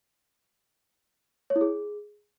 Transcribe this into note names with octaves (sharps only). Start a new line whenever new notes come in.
C#5
E4
G#4